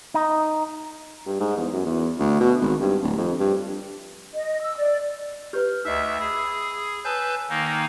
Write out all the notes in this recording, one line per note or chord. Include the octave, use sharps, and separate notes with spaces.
D#4
G2
G#2
E2
F#2
E2
D2
B2
G#1
G2
D1
F2
G2
D#5
E6
D5
G4 B4 C5 F6 G6
D2 D#4 D#5 E5 E6 C7
G#4 B5 E6 G#6
B4 C#5 G#5 A5 E6 G6
D#3 A#3 D#4